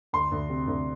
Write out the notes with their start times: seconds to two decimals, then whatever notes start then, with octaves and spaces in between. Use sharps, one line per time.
0.13 D2 C6
0.31 D2
0.49 C3
0.67 D2